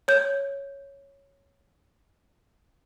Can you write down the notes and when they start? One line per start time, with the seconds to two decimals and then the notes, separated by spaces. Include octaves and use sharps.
0.08 C#5 G6